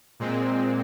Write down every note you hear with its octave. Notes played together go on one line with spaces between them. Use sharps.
A#2 G#3 C4